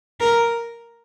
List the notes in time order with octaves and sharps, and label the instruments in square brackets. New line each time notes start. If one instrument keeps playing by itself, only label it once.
[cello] A#4